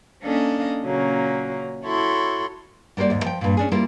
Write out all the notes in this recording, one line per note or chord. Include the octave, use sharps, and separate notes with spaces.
A#3 C#4 D4 A4 D#5 F5
A#2 C#3 F#3 A#3 C#4
E4 F#4 A4 C#5 B5 C6
G3 A#3 F#4 C5 D5
D#2 G#2
F3 G5
G2 A#2
C#4 D4 G#4
G3 A#3 E4 F4 C5